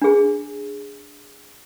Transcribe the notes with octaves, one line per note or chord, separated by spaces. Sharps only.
D4 G#4